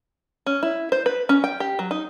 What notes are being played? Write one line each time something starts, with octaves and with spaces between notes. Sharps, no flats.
C#4
E4
C5
B4
C#4
G5
G4
F#3
D#4